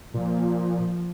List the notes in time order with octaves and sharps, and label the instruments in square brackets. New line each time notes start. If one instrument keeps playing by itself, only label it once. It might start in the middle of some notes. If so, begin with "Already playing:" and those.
[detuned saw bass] A#2 [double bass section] F3